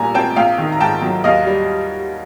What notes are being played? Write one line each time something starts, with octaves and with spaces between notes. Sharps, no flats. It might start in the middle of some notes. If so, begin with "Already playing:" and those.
Already playing: A#1 A#2 G3 G#5 A#5
C4 G5 A5
A#1 F5 G5
D#3
A#5
G#2 G5 A5
F#3
D#2 D#5 F5
G3